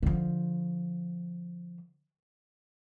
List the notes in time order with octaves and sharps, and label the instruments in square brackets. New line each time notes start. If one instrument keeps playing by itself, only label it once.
[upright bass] D3 F3